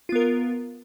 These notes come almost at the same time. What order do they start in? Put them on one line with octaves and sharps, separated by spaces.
F4 B3 A#4